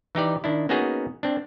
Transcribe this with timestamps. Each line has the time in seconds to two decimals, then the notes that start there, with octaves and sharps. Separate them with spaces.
0.15 E3 D#4 G4 D5
0.44 D#3 D4 E4
0.69 A#3 B3 C#4 D#4 F#4 G#4
1.23 C4 D4